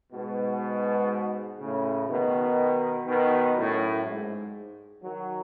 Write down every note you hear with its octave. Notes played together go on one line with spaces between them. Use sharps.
G#2 B2
A2 C#3
B2 D#3
B2 D#3
F#2 A2
G#2
D#3 F#3